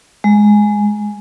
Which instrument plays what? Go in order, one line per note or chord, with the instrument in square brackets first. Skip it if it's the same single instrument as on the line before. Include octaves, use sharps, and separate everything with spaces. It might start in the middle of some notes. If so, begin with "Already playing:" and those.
[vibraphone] G#3